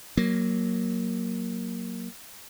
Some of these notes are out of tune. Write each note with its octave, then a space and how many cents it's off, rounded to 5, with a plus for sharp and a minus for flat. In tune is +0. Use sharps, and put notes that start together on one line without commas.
F#3 +0 A#3 +0